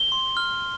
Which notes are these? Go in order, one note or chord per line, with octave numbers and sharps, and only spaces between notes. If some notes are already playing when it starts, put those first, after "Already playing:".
Already playing: G7
C6
F6